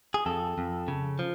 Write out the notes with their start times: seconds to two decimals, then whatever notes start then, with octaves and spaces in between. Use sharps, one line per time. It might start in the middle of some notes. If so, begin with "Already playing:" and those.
0.14 G#4
0.26 F2 A4
0.58 F2
0.88 C#3
1.19 F3